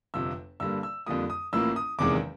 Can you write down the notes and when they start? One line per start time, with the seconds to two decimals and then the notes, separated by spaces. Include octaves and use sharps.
0.14 G1 F2 C3 E6
0.60 G2 D3 G3 A#3 E6
0.83 E6
1.06 F2 D3 G3 A#3 D#6
1.30 D#6
1.53 A1 A2 F3 A#3 E6
1.76 D#6
1.99 F#1 E2 C3 D#3 G#3 D6